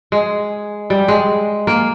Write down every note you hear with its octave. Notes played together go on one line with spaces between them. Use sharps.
G#3
G3
G#3
A#3